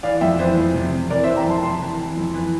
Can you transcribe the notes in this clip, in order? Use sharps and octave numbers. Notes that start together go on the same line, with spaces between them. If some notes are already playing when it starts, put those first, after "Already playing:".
E3 D5 F5
F2 E5 G5
E3 C5
F2
C3
C3
E3 A#4 D5
C5 E5
E3
G5 A#5
F2 A5 C6
C3 A5 C6
E3
E3
F2
E3